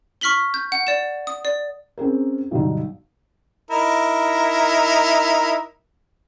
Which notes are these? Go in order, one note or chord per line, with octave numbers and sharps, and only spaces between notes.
C#6 F6 B6 F#7 G7
G6
F#5
D5 E7
D#6
D5
C4 C#4 G#4 A#4
B1 G2 D3 D#4
D#4 E4 A#4